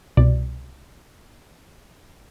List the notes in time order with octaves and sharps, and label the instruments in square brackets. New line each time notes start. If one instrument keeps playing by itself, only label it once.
[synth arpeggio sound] C2 B2 D5